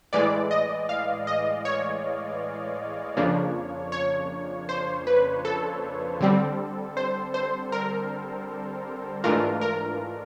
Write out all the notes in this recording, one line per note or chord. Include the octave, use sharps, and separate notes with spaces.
A2 E3 G#3 D5
D#5
F5
D#5
C#5
F2 C#3 F3 A#3 D4
C#5
C5
B4
A4
D3 G3 C4
C5
C5
A#4
G#2 E3 A3 D4 F4 A#4
A#4